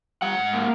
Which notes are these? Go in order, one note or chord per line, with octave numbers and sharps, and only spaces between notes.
G3 F#5
G#2
A#3